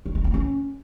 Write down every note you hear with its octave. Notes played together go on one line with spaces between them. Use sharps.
G3
G#3
A#3
C#4